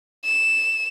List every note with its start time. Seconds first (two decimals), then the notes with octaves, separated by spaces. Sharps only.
0.25 E7